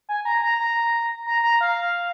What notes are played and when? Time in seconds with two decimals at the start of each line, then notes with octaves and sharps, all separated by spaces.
0.09 G#5
0.25 A#5
0.42 A#5
0.59 A#5
1.26 A#5
1.43 A#5
1.61 F5